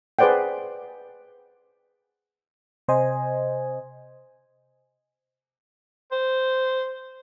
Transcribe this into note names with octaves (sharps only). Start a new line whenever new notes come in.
G#4 B4 C5 D5 F#5 G5
C3 C5 D#5 G#5
C5